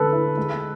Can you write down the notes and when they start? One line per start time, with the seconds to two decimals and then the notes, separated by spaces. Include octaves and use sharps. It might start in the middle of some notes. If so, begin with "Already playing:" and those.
Already playing: D3 G#3 C#4 A4 B4
0.12 E4
0.37 G#3